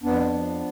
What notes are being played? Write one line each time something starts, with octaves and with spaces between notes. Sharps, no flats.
F2 B3 D4
F3